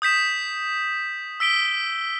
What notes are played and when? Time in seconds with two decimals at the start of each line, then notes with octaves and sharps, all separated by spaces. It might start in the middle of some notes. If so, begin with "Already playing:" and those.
0.02 D#6 G6 B6 E7
1.40 E6 B6 D7 G7